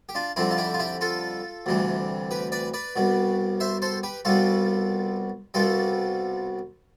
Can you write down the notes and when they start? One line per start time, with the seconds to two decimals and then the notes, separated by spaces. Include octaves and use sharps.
0.09 G4
0.15 D4 F4
0.36 F2 D3 G3 C4 E4
0.51 F4
0.58 E4 G4
0.74 F4
0.79 E4 G4
1.01 F4 A4
1.66 D2 C3 E3 G3
2.31 G4 B4
2.52 B4 D5
2.74 B4 D5
2.96 C2 B2 G3
3.60 C5 E5
3.82 A4 C5
4.03 G4 B4
4.25 C2 B2 G3 F4 A4
5.54 C2 B2 G3 F4 A4